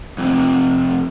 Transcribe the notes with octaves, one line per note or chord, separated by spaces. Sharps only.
F2 C3